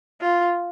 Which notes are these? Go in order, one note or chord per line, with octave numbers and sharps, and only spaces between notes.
F4